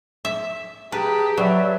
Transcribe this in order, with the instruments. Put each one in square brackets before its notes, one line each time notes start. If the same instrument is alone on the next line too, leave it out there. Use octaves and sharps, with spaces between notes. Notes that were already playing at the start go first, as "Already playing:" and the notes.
[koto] E5
[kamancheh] G4 [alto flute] G#4 [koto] B4 [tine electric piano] A5 A#5
[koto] F#3 [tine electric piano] B4 C#5 E5 [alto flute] D5